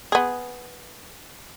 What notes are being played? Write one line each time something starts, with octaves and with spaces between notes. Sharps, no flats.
B3 G#4